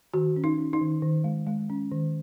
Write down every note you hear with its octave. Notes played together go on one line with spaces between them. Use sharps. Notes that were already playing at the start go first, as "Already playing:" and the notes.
D#3 F#4
C#4
D#4
C#4
D#4
D#3
D#3
G#3
G#3
C#4
D#3